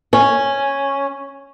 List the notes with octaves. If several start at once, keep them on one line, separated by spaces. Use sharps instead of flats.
C#4